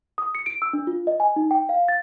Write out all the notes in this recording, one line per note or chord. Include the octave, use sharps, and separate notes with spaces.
D#6
C#7
D7
E6
D4
F4
D#5
G#5
D#4
G5
F5
A6